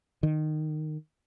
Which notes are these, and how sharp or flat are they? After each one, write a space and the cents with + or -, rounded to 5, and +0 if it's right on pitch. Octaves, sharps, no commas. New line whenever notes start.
D#3 -15